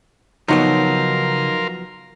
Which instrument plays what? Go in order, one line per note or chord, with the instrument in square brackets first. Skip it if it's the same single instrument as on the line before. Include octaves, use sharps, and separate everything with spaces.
[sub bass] C#3 [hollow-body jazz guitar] F3 F#3 B3 [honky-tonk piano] D#4 [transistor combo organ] A#4 F5 C6